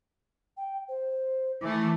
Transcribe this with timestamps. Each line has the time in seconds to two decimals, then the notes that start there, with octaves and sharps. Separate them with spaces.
0.57 G5
0.89 C5
1.61 E3 A3 D6